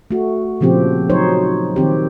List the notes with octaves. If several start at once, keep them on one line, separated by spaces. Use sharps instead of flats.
A3 F#4
A#2 C#3 F3 C4 G4
F#3 D#4 C5 C#5
D#3 C4 G4